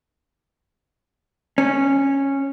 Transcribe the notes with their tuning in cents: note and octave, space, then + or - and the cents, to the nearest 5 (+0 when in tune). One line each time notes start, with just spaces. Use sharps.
C#4 -10